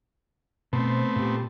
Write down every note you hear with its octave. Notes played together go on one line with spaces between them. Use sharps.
B2 A3 B3 C4 C5
A#2 G4